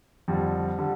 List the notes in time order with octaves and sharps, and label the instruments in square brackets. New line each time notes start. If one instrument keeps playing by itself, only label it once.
[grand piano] F2 D3 G3
D3 G3